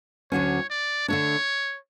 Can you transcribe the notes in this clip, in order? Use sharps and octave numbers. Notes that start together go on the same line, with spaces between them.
D2 D3 F#3 C#4 C#5
D5
D3 A3 D4 C#5